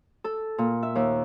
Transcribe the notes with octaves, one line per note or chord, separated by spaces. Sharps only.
A4
A#2
E5
D#2